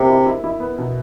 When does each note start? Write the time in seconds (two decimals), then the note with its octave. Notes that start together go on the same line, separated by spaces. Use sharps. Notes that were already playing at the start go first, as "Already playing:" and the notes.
Already playing: C3 A#3
0.09 E4
0.26 E4
0.44 E4
0.60 B3
0.78 B2